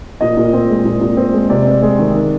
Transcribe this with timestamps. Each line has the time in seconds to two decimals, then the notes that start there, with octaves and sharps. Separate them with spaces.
0.21 A#2 D#5
0.37 A#2
0.53 C4
0.70 G#3
0.85 A#2
1.01 A#2
1.17 C4
1.33 G#3
1.50 C3 D5
1.66 C4
1.82 G#3
1.98 D#3
2.14 D#3